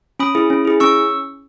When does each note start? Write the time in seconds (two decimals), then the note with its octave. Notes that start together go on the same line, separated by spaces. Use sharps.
0.19 C#4 B5 D#6
0.35 E4 G#4
0.50 C#4
0.65 E4 G#4
0.80 C#4 C#6 E6